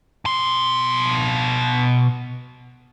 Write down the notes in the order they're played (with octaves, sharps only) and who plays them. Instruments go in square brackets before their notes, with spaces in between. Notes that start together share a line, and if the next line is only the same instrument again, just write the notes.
[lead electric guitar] B2 C6